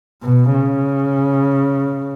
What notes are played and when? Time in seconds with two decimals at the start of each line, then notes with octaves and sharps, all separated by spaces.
0.23 B2
0.54 C#3